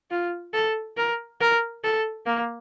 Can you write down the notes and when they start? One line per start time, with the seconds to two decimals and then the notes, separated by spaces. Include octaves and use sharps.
0.11 F4
0.53 A4
0.97 A#4
1.40 A#4
1.84 A4
2.26 A#3